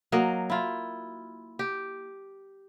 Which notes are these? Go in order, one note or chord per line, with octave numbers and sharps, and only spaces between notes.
F#3 A#3 D#5
E4 F4
G4